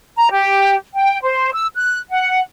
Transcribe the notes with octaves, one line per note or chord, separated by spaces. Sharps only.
A#5
G4
G5
C5
E6
F#6
F#5